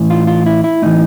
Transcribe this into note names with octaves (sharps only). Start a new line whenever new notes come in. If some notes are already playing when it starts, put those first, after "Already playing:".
Already playing: A2 E3
F4
F4
E4
E4
A2 E3 D#4